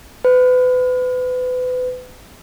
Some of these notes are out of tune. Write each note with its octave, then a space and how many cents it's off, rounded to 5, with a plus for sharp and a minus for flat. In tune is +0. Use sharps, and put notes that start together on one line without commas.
B4 +30